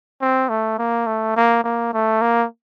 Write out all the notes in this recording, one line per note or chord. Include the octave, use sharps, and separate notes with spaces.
C4
A3
A#3
A3
A#3
A#3
A3
A#3